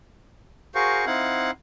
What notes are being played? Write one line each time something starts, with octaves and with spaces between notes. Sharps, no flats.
F#4 G#4 A#4 C5 F5 C#6
C4 D#4 E4 F5 F#5